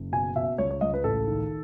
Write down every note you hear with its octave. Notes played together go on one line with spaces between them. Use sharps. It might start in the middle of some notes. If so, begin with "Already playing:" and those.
Already playing: F#1
B2 G#5
B2 E5
C#2 C#5
C#5
C#2 D#5
B4
A1 A4
D#3